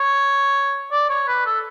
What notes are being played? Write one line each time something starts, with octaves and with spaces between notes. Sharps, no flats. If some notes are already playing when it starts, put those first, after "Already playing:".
Already playing: C#5
D5
C#5
B4
A4